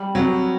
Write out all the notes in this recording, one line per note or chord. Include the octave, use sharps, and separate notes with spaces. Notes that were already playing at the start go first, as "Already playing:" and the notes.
Already playing: G3
F#3